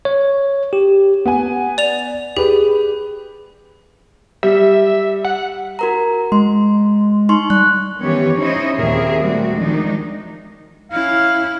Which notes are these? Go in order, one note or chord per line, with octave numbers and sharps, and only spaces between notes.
C#5
G4
B3 G#5
D5 F7
G4 G#4 B4
G3 E5
F#5
F#4 A#4 A#5
G#3 C6
D#4 C6 C#6
G3 F#6
D#3 E3 B3 C#4 G4 C#5
C#4 D#4 E4 C5 C#5 D#5
D#2 A#2 C4 G#4 A#4 E5
G3 A3 C4 F#4
D#3 F3 G#3 D4 D#4
C#4 E4 F5